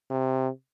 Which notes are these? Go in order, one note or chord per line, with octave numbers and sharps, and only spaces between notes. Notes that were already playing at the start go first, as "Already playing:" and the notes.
C3